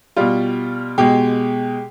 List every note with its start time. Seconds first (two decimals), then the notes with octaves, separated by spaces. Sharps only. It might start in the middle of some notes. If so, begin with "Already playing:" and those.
0.16 B2 G3 F4
0.98 B2 G#3 G4